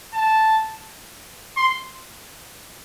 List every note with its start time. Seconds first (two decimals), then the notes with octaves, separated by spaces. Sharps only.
0.14 A5
1.57 C6